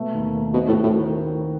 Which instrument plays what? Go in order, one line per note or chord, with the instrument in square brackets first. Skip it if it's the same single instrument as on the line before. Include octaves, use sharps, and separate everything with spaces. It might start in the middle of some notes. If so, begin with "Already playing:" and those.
Already playing: [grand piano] B2 A3
D#2
D#2
[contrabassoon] B2 [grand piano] C4
[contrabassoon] A2
[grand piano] F#4
[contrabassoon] A2
[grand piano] D#3